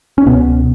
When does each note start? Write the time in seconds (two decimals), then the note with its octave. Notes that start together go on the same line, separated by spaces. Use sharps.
0.18 C#4
0.26 C#2 B2 B3